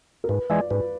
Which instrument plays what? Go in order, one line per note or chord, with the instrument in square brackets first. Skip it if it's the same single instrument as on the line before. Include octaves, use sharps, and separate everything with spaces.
[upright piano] A#4
[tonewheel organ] G#2 [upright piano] B4
[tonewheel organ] E3 G#3 [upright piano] D5
[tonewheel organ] G#2 [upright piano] B4